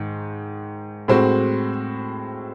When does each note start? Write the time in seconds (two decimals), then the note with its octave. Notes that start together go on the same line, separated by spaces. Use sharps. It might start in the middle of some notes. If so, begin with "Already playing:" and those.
Already playing: G#2 D#3
1.08 A2 G#3 C4 F#4